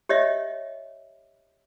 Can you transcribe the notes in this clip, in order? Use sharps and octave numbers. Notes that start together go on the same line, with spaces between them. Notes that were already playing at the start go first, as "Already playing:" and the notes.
G4 C#5 D#5 E5